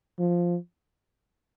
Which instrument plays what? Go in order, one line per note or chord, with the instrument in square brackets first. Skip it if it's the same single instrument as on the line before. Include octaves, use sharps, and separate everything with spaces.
[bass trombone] F3